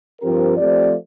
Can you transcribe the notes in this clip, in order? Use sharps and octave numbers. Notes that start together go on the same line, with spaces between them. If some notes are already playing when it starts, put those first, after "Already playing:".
G2 F3 C4 G4 A#4
F3 A3 C4 G4 D5